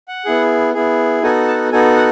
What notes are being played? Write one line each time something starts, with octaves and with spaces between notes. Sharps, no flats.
F#5
B3 E4 G#4
B3 E4 G#4
B3 D#4 F#4 A4 G#5
A5
B3 D#4 F#4 A4 G#5
F#5